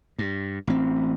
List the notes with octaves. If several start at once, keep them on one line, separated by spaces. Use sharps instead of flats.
G2
A1 C4